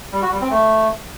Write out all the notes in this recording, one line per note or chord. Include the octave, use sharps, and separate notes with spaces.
G3
F#4
G3
C4
A3